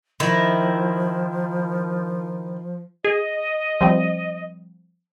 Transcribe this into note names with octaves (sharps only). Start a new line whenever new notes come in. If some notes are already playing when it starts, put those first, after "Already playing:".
D#3 F3 E4
G#4 D#5
F3 G3 C4